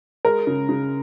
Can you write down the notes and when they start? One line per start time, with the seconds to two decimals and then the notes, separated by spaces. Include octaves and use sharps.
0.25 G#3 A#4
0.47 C#3
0.69 C#3